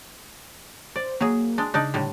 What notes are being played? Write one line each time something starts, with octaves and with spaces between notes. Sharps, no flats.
C5 D5
F#3 A#3 G#4
G#3 D4
C#3 D4 D#4 D5
A2 D3 G3